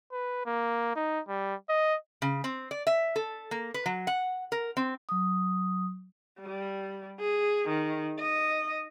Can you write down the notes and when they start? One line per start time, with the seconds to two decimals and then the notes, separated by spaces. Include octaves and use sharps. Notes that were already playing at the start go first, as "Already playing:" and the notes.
0.12 B4
0.46 A#3
0.96 D#4
1.29 G3
1.69 D#5
2.22 C#3
2.44 C4
2.71 D5
2.87 E5
3.16 A4
3.51 A#3
3.74 B4
3.86 F#3
4.07 F#5
4.52 A#4
4.77 C4
5.09 F#3 D#6
6.41 G3
7.20 G#4
7.69 D#3
8.19 D#5